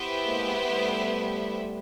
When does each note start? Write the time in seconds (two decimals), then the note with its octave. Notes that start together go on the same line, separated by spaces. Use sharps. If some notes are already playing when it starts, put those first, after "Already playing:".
Already playing: B3 E4 G4 C5 E5
0.24 G#3 A#3
0.69 G3 A3